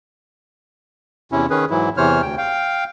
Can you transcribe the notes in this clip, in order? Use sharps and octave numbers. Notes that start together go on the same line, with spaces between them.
E2 C3 C#4 E4
D#3 C#4 G#4 B4
G#2 E3 F#3 E4
E2 C3 E3 C5 C#5 F6
D2 G5
F5 G5